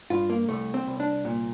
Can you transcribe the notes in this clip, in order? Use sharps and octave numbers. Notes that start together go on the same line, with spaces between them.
G2 F4
A#3
C2 A3
C4
C2
D4
A#2